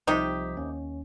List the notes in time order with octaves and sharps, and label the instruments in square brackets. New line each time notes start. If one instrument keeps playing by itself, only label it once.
[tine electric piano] C2 F3 B6 [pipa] C3 D#4 G4
[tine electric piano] D#2 C#4